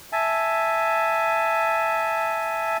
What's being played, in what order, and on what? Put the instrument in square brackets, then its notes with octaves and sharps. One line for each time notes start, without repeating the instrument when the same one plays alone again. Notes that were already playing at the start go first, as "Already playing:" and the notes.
[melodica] E5 G#5 A5